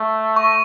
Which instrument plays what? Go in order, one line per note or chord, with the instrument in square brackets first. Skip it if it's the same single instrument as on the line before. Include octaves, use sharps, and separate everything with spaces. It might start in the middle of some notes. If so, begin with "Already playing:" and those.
Already playing: [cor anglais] A3
[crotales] C#6